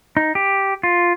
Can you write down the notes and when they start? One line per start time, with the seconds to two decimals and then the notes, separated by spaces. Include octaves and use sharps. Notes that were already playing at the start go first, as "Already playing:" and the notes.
0.17 D#4
0.35 G4
0.83 F4